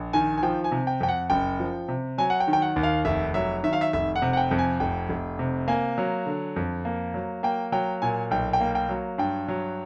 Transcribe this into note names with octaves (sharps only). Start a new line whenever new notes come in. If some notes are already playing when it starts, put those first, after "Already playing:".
Already playing: A#1
D#3 G#5
G#5
F3 G5
G#5
C3
G5
F2 G5
F#5
F#1 G5
F3
C3
F#3 G#5
F#5
G5
D#3
G5
F#5
D#2
F5
F1 E5
F#3 E5
D#3 E5
F5
E5
F1 E5
F#5
C3
F#5
G5
F2
G#5
F1 G5
F1
C3
A#3 G#5
F#3
D3
F2
A#3
F#3
A#3 G5
F#3 G5
A#2 G#5
B1 G5
G5
A#3
G5
F#3
G2 G5
F#3